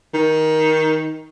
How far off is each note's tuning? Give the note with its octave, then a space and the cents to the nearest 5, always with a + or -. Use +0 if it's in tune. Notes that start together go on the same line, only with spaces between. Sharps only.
D#3 +15